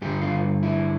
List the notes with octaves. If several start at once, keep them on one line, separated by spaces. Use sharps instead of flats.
G2 D3 G3 G4
F4
E4